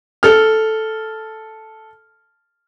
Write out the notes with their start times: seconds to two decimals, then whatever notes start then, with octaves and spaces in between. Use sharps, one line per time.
0.23 A4 F6